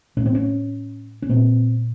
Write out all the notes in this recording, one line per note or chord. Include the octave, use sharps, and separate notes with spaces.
A2 C#4
C4
C#4
C#4
A#2 C4